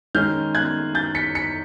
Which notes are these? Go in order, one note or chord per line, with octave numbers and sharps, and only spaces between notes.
D#3 G#3 C#4 F6 G6
F#6 G#6
G6 A6
B6 C#7
B6 C#7